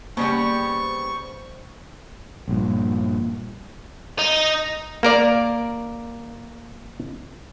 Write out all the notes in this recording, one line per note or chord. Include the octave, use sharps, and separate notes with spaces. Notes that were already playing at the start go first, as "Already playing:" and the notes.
C#3 G3 A#3 B3 C5 C#6
A#1 G2 A#2
D#4
A#3 A#4 D5